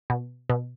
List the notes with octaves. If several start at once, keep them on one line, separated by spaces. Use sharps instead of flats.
B2
B2